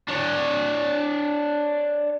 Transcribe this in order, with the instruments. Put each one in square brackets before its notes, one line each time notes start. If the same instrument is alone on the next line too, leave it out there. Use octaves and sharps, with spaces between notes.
[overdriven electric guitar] D4 C#5